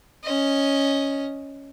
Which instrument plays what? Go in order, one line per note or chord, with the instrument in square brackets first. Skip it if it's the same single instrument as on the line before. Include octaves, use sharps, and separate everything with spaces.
[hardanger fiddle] C#4 D#5